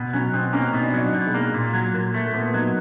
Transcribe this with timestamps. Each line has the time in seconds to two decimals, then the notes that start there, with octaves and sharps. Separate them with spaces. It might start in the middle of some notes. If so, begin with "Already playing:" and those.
Already playing: B2
0.13 F#3 C#4
0.33 B2 C4
0.53 A#3 C#4
0.73 B2 D#4
0.82 D4
0.90 D#4
0.94 F#3
1.00 D4
1.14 B2
1.27 G#3
1.34 A#3
1.54 A#2
1.74 F#3
1.94 A#2 A#3
2.14 A3
2.24 A#3
2.34 A#2 B3
2.53 F#3 D#4